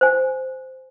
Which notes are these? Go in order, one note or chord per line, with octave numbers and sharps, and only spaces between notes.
C5 G#5